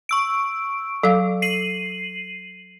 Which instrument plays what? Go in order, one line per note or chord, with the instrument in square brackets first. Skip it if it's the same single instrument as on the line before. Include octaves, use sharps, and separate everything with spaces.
[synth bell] C#6 E6 D7
[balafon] F#3 F5 [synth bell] A4
[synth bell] C7 D#7 F#7